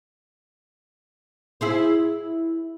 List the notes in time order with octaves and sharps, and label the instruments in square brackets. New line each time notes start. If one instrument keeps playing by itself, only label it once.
[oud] E4 G#4 C5